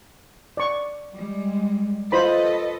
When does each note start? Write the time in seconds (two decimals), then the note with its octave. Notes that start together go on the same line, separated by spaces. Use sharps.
0.57 D5 C#6
1.15 G3 G#3
2.12 F4 A4 B4 C5 D#5 B5